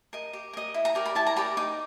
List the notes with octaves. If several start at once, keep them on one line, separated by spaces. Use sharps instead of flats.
A#4 D#5
G4
A#4 D#5
E4
A#5
G4 A#4 D5
B5
E4 A5
A#5
G4 A#4 D5 B5
D#4 D6